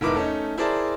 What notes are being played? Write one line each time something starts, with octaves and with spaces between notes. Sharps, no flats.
E1 G#2 E4 A#4 B4 D6
A3 C#4 D#4
E4 G#4 A#4 C5 D5 A5